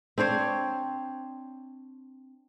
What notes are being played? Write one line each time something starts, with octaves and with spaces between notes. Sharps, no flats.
C4 D4 C5 C#5